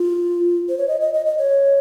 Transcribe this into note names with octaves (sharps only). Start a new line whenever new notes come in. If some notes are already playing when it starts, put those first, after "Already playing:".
Already playing: F4
C5
C#5
D#5
D#5
D#5
D#5
C#5